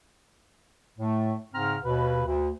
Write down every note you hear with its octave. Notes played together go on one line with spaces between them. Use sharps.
A2 A3
G#2 C#3 C4 A#5 F6
D#2 B2 B4
D2